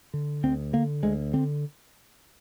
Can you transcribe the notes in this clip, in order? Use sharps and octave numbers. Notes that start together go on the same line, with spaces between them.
D3
D2 C4
D3 A#3
D2 G#3
D3 C4